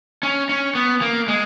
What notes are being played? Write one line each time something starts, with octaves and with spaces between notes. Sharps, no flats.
C#4
C#4
B3
A#3
G#3